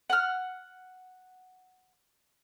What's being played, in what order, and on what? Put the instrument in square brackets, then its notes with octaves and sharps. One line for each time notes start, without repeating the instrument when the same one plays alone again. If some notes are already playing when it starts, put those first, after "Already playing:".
[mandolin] F#5 F6